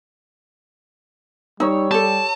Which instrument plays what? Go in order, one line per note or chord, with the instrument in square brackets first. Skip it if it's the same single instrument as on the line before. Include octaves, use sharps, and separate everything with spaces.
[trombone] G3 [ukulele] D#4 [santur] C#5 E6
[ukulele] G4 A4 [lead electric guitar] A5